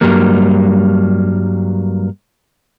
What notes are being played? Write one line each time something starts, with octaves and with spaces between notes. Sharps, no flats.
G2 F#3 G3 A#3